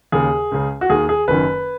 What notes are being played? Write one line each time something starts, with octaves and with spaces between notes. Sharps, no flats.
D#2 C#3 G#4
C#2 C#3
F#4
D#2 D#3 G#4
G#4
F#1 F#2 D#3 B4